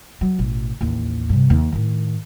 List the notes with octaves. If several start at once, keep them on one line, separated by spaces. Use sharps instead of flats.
F#3
A1 B2
A1 D#2
G2 C3
D#2
A2 D#3